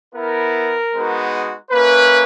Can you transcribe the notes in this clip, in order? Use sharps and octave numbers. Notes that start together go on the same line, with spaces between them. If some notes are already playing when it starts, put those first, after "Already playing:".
B3 E4 A#4
G#3 B3 D#4 F#4
A#3 C#4 E4 B4